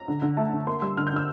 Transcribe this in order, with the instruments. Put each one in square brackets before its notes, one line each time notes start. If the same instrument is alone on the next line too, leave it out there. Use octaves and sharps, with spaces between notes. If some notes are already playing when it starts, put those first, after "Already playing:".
Already playing: [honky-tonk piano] A#5
D3
D3
A3 A5
D3
A#3 C6
G3 E6
D3 F6
G6
D3 E6